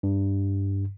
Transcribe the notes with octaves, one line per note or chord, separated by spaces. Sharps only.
G2